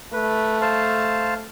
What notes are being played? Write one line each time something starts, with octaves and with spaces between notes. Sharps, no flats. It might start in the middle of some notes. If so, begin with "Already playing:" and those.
A3 B4
C5 F5 A5